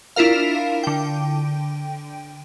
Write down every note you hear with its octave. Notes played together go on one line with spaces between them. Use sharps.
D4 E4 F4 A#4 F5
D3 G5